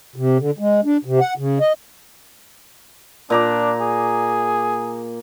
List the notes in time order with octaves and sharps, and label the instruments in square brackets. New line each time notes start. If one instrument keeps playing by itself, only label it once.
[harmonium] C3
D3
G#3
D4
C3
F#5
C#3
D#5
[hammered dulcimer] A#2 A#5 D6 [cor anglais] D4
[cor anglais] G#4